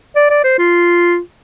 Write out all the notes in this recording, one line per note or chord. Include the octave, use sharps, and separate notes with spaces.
D5
D5
C5
F4